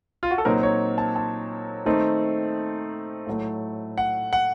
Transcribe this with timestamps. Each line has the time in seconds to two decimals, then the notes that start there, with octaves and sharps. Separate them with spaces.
0.23 F4
0.31 F#4
0.38 A4
0.45 A#2 F#3 C4 D#4 A#4
0.63 C#5
0.98 A5
1.16 A5
1.86 D#3 A3 C4 D#4
3.27 A2 F#3 A3
3.98 F#5
4.33 F#5